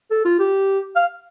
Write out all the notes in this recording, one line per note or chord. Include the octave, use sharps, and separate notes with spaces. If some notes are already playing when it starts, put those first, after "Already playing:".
A4
F4
G4
F5